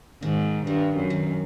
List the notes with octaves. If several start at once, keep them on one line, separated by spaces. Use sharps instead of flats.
G#2 D#3
G2 D#3
F#2
D#3